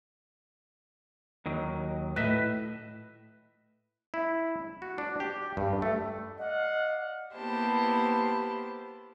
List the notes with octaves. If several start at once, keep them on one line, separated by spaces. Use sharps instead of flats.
D#2 D#3 F#3
A2 B4 D#5 E5
E4
F#4
D4
G4
G2
A3
D5 D#5 F5 F#5
A#3 B3 E4 G4 C5 A5